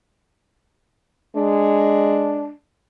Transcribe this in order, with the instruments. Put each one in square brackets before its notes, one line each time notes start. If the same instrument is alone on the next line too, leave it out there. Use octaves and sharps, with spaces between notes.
[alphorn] G#3 [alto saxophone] D4